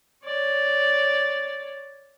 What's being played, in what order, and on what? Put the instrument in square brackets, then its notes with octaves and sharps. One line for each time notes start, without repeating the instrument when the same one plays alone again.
[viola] C#5 D5